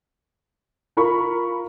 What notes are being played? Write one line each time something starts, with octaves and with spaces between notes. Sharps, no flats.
F4 A#4 B5 C#6